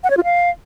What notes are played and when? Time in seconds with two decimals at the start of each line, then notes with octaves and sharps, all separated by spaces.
0.04 F#5
0.10 C#5
0.17 F4
0.24 F5